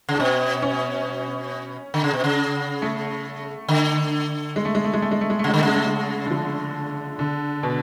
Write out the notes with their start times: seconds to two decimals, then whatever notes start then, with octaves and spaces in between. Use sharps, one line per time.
0.09 C#3
0.15 D4
0.19 B2 C#4
0.62 C#4
1.94 D3
2.04 C#3
2.13 B2
2.24 C#3
2.82 A3
3.68 D3
4.56 G#3
4.65 A3
4.75 G#3
4.84 A3
4.93 G#3
5.02 A3
5.11 G#3
5.21 A3
5.30 G#3
5.39 A3
5.44 C#3
5.48 G#3
5.54 D3
5.58 A3
5.63 C#3 G#3
5.76 A3
5.86 G#3
6.26 D3
6.31 F3
7.19 D3
7.63 B2